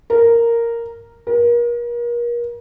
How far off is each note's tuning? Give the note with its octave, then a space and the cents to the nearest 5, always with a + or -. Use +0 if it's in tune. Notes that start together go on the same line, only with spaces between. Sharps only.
A#4 -5
A#4 +35